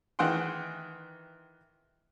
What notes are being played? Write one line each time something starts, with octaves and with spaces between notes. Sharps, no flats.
D#3 E3 G#4 F#5 G5 C6